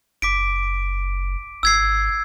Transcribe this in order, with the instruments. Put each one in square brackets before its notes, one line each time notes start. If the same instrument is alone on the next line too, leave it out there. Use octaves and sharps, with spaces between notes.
[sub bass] F#1 [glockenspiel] D6 B6 D7
[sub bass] G#1 [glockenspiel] E6 G#6 C7